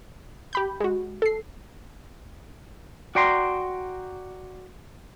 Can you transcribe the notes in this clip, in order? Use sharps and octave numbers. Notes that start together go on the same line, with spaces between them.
G4 B5 G6
G#3 F#4
A4 C7
F#4 D5 G5 A#5 C6